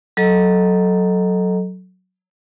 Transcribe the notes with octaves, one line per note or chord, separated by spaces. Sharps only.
F#3 A4 D#5 A#5